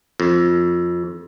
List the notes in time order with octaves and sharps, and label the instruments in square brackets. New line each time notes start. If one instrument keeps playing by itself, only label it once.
[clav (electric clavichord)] F2